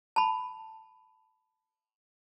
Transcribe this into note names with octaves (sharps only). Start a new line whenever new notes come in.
A5 B5